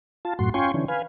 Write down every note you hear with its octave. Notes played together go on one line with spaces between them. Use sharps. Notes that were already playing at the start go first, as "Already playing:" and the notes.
F4 A5
F#2 A2 F#4 C6
C#4 F4 G5 G#5 C6 C#6
D3 E3 C#4
B4 F5 G#5